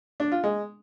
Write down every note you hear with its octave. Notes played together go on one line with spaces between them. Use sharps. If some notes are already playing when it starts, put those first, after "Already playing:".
D4
F4
G#3